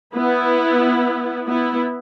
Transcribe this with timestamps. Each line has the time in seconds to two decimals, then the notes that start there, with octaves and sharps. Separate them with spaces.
0.14 B3 E4
1.46 B3 E4